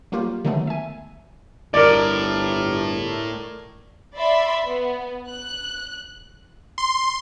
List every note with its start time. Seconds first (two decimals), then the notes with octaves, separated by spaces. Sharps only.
0.12 F#3 G3 A#3 F4 G4
0.45 D3 D#3 F#3 G#3 A3 B3
0.67 E5 G#5
1.74 G1 A2 A#4 D5
4.14 D5 E5 B5 C6
4.65 B3
5.28 F#6
6.78 C6